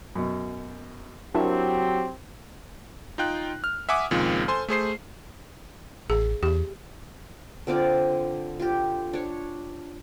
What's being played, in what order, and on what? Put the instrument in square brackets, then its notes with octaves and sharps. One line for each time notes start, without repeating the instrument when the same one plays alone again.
[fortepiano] F#2 B2
[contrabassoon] F#3 [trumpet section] C4 G4 [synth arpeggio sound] D4 E4 A#4 [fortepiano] A5
[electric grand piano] D#4 F4 G5 F#6
F6
E5 F#5 G#5 D6 D#6
C#2 A#2 D#3 F3 G#3 C4
A4 C5 G#5 C6
A3 G#4 C5 C7
[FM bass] A1 [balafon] G#4
[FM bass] E2 [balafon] G4
[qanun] D3 C4 F4 D5
F4 G4
D4 C#5